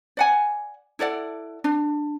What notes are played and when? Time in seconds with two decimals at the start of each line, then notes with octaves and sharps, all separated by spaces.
0.17 D5 F#5 G#5
0.99 E4 A4 D5 F#5
1.64 D4